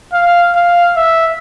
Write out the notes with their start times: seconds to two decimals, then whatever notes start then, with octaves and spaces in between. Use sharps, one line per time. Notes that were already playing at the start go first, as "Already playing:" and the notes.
0.13 F5
0.55 F5
0.96 E5